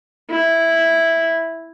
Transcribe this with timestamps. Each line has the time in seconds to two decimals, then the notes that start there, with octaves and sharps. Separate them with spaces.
0.30 E4